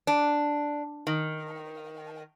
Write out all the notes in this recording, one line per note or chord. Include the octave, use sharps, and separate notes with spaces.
D4
D#3